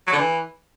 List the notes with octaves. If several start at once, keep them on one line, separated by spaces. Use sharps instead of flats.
F#3
D3
E3